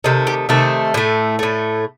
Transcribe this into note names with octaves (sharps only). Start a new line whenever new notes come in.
C3 D#3 A3 D#4
G4
C3 D#3 A3 A4
A2 A3
A2 A3